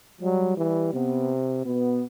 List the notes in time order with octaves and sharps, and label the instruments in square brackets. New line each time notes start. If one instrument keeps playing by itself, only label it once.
[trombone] F#3 [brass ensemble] G3
[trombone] E3 [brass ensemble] G3
[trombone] C3 [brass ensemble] B3
[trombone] B2 [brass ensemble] B3